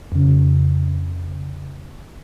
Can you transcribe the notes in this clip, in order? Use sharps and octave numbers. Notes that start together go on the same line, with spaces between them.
F2 C#3